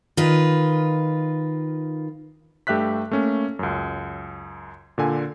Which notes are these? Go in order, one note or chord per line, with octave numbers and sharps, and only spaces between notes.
D#3 F4 B4
G2 A3 G4 E5 F#6 B6
A3 A#3 C#4
C#2 F#2
A#2 D3 G#5